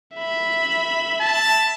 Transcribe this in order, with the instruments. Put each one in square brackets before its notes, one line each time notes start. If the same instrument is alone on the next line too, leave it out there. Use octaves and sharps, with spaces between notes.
[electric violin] E5 B5
[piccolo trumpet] A5